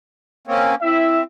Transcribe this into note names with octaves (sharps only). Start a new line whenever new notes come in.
A#3 C4 C#4
C4 E4 E5